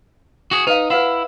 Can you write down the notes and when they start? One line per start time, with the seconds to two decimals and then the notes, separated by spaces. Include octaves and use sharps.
0.51 F#4 G#4
0.67 D#4 B4 F5
0.90 E4 B4 F5 F#5